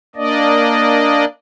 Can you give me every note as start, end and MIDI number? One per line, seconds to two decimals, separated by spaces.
0.16 1.25 58
0.16 1.25 62
0.16 1.25 74
0.16 1.25 75